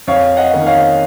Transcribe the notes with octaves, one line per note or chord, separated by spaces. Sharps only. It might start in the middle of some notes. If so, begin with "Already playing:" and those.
F2 C#5 F5
D#5 F#5
D#3 A#3 C#4
C#5 F5